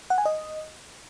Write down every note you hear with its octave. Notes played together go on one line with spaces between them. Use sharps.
F#5
G#5
D#5